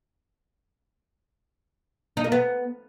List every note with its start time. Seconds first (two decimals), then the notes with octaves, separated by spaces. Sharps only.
2.17 D#4
2.24 A#3
2.32 B3